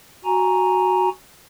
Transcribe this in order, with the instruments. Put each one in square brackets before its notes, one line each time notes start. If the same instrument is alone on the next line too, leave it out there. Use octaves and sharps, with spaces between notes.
[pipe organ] F#4 G#5 A#5